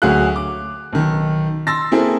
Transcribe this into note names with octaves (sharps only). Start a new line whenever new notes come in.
D2 F#3 F#4 G#4 F5 F#6
D6
B1 D#3
C6 E6 A6 A#6
A#3 C4 E4 G#4 A4